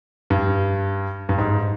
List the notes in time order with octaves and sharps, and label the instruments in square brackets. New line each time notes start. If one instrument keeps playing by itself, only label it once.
[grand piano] G2
G2
G#2